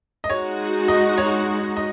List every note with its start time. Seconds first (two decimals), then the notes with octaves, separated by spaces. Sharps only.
0.24 D#5
0.30 G#3 D#4 F#4 C#5
0.88 D#5
1.18 C#5
1.77 D#5